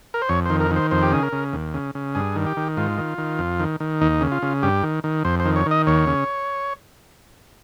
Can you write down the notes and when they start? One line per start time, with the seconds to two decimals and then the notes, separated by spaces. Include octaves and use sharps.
0.14 A#4
0.22 C5
0.29 F2 C#5
0.45 D#3 C5
0.60 A#4
0.71 D#3 C5
0.91 F2 C5
1.03 G4
1.12 C#3 G#4
1.23 A#4
1.32 C#3
1.53 D#2
1.74 C#3
1.95 C#3
2.15 G2 G#4
2.36 D#3
2.46 G4
2.57 D#3
2.77 G#2 F4
2.98 D#3
3.18 D#3
3.39 F2
3.59 D#3
3.80 D#3
4.01 D#2 D#4
4.21 C#3
4.32 F4
4.42 C#3
4.63 G2 G4
4.83 D#3
5.04 D#3
5.25 F2 C5
5.40 C5
5.45 D#3
5.56 C#5
5.66 D#3
5.71 D#5
5.87 D#2 C#5
6.07 C#3